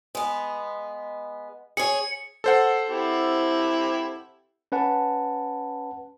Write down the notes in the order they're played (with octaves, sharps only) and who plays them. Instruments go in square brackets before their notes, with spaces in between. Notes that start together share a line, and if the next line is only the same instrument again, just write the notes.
[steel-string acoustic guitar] G#3 B3
[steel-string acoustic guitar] G#4 C#5 [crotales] C#7 F#7
[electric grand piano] A4 C5 F#5
[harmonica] C4 E4 G4
[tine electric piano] C#4 B4 F#5 A5